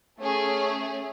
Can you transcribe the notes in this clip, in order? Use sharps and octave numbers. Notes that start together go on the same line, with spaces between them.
A3 C#4 G#4